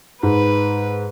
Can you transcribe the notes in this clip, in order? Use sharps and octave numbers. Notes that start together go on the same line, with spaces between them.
G#2 B4